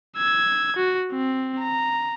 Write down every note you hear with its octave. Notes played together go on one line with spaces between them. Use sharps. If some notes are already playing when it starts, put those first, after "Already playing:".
E6 G#6
F#4
C4
A#5